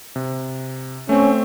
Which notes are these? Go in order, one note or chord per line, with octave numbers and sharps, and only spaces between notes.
C3
A3 C4 C#4